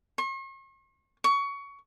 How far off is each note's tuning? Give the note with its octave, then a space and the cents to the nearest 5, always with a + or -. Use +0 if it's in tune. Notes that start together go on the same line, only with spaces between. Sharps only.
C#6 -45
C#6 +20